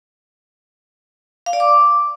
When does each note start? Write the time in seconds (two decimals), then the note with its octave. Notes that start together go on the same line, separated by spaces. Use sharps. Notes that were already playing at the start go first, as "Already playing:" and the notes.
1.46 F5
1.53 D5
1.60 D6